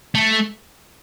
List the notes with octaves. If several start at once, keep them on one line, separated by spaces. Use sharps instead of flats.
A3